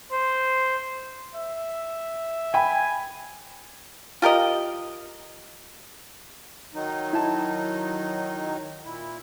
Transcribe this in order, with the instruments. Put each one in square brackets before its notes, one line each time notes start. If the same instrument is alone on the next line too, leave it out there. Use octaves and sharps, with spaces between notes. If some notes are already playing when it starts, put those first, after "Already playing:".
[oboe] C5
[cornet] E5
[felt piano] G5 B5 [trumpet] G#5
[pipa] F4 G4 A#4 D#5
[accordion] D#3 F#3 D#4
[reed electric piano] E4 A5
[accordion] A#2 E4